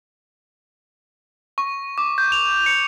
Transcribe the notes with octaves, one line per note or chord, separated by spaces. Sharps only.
C#6
D6
G6
F7
C#7